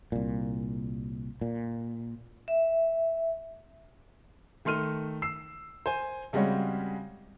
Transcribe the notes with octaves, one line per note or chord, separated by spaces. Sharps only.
C2 A#2
A#2
E5
D#3 A3 C6 F6 D#7
E6 C7
C5 G#5
C#3 G3 G#3 C4 F#4 C#5